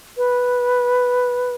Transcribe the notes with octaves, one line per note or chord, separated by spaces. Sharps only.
B4